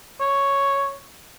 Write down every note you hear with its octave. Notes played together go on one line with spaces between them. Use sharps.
C#5